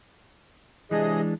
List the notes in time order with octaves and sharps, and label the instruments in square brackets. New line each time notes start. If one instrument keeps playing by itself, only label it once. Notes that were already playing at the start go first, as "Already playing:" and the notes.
[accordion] C3 G#4 D#5 [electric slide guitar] E3 G#3 D4